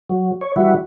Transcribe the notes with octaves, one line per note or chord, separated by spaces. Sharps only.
F#3
C#5
E3 G3 E4 F#4